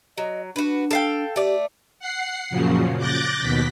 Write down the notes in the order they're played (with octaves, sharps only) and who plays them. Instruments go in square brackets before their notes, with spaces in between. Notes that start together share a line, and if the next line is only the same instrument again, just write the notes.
[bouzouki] F#3 [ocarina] D#5
[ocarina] D4 [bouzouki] F#4 B4
[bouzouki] A4 F5 G5
[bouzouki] A3 D5 [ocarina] G4
[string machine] F#5 C7
F#2 A#2 C#3 F3 F#3
D6 F#6 G6 A6 A#6
D#2 B2 B6